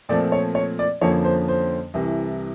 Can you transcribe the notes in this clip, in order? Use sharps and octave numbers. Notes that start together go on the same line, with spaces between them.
A#2 F3 A3 C4 D5
C#5
C#5
D5
F2 D3 F3 A#3 C#4 C#5
C5
C5
C2 C3 E3